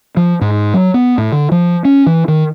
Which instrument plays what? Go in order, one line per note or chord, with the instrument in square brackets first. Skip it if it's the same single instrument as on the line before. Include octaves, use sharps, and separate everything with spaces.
[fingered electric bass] F3
G#2
F#3
B3
A2
D3
F3
C#4
E3
D#3